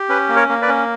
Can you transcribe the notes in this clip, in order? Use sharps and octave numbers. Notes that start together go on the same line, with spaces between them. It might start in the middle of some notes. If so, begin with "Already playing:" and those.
Already playing: G4
C#4 B4
A#3
A#4 C#5
A#3
B4 D5
C#4